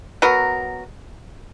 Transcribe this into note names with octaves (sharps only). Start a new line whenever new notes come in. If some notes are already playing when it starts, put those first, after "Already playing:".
F#3 B3 F#4 A#4